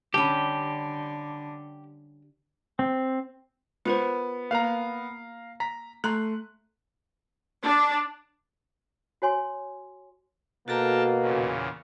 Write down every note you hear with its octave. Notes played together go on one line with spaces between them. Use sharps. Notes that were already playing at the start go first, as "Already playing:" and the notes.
D3 G3 C#4 G4 A5 B5
C4
B3 F4 A#4 C5
A#3 A#4 F5 A#5
A#5 B6
A3 A#5 C6 F#6
D4
F#4 C#5 G#5 C6
B2 A#3 F#4 A4 A#4 G5 A5 A#5
E2 A#2 C#3